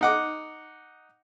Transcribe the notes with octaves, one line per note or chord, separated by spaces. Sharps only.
D#4 F#5 D6